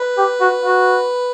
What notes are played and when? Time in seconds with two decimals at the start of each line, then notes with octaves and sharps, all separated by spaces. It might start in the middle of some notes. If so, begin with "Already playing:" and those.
Already playing: B4
0.18 G4
0.41 F#4
0.63 F#4